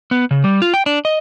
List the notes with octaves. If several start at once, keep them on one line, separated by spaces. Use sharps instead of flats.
B3
C#3
G3
F4
G5
D4
D#5